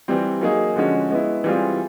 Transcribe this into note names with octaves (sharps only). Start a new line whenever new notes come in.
E3 G3 C4
F#3 A#3 D#4 G#4
D3 F3 G#3 C#4 F#4
G#3 B3 E4
E3 G3 C4 F4 G#4